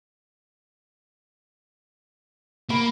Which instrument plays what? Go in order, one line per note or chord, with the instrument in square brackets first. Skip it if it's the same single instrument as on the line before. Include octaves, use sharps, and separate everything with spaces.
[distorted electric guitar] A#3 [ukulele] B5